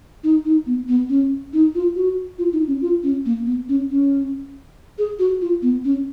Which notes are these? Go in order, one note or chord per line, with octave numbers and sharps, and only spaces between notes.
D#4
D#4
B3
B3
C#4
D#4
F4
F#4
F4
D#4
C#4
F4
C#4
A#3
B3
C#4
C#4
G#4
F#4
F4
B3
C#4